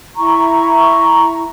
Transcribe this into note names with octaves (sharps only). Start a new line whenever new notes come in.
E4 A#5 C#6